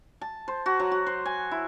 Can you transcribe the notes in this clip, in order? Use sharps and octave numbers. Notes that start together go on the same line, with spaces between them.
A5
C5
F#4
F#3
F#4
C5
G#5
E4